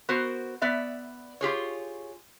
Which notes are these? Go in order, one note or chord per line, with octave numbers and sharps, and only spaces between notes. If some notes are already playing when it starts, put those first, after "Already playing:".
B3 F#4 A#4 C5
B3 D5 E5
F4 G4 G#4 C#5